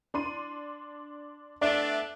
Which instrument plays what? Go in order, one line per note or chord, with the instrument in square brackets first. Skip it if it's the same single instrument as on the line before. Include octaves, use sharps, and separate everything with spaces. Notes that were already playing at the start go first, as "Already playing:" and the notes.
[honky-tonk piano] D4 C6 D#7
[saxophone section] A3 B3 D4 [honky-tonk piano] D5 E5